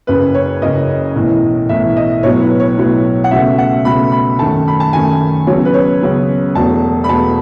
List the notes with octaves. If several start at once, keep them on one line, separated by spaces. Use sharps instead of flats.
F#1 F#2 C#3 B4
C#5
F#1 F#2 C#3 D#5
B1 A2 E3
B1 A2 E3 E5
D#5
B1 A2 F#3 B3 C#5
B4
C#5
B1 A2 F#3 B3
F#5
C#2 B2 A3 E5
F#5
C#2 B2 A3 B5
B5
F#2 D#3 A3 A5
B5
A5
F#2 D#3 A3 G#5
C#2 C#3 F#3 B3 C#5
B4
C#5
C#2 C#3 F#3 B3
E1 E2 B2 A3 A5
B5
E1 E2 B2 A3 A5